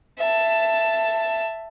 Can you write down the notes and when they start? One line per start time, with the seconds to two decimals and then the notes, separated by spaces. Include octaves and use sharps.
0.19 E5 A5